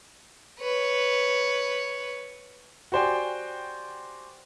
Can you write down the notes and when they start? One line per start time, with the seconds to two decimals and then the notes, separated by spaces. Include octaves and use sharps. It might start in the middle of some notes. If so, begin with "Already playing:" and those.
0.60 B4 C#5
2.92 F#4 G4 C5 D5 G5 G#5